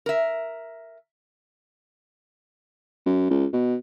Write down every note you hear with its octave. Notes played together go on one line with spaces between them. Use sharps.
A#4 E5
F#2
C#2
B2